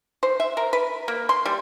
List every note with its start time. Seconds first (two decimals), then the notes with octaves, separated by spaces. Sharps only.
0.23 C5
0.40 E5
0.57 A#4
0.73 B4
1.08 A#3
1.29 C6
1.45 G3